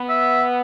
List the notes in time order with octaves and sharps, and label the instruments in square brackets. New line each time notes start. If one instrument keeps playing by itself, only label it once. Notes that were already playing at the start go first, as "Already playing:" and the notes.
Already playing: [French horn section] B3
[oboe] E5